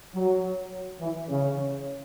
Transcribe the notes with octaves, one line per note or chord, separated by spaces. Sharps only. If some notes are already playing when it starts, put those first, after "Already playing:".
F#3
E3
C#3